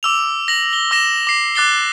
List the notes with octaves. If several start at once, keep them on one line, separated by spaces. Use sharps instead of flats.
D6 E6 F7
A#6 F#7
G7
D6 E6 A#6 E7
D6 C7
D6 F#6 A6 C7 G7